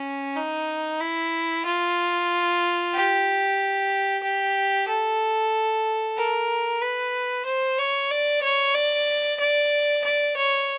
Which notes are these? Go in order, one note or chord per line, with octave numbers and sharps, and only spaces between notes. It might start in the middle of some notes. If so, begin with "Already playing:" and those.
Already playing: C#4
D#4
E4
F4
G4
G4
A4
A#4
B4
C5
C#5
D5
C#5
D5
D5
D5
C#5